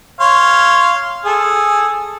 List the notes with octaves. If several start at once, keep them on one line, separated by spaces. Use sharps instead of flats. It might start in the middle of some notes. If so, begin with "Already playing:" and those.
C#5 F5 C6
G#4 A4